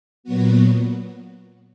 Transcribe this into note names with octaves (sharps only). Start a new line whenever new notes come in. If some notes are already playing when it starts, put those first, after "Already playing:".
A#2 F#3 B3 F#4